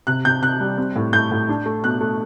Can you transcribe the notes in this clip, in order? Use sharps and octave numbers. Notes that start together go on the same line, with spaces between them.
C3 F#6
C3 G6
C3 F#6
G3
C4
A2
A2 G6
A2
D4
A3
B2 F#6
A3